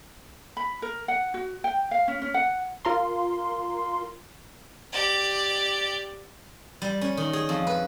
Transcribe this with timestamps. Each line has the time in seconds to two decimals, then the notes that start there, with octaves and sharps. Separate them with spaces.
0.57 B5
0.82 A#4
1.08 F#5
1.34 F#4
1.64 G5
1.91 F5
2.08 C#4
2.22 C#4
2.34 F#5
2.85 F4 A#4 C6
4.92 G4 D5
6.82 G3
7.01 C#4
7.17 D#3
7.33 G#4
7.49 F2
7.67 B4